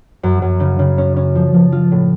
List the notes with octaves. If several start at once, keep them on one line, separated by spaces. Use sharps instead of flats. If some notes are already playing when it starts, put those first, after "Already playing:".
F#2
F#2
C#3
C#3
C#4
C#4
F3
F3
F4
A2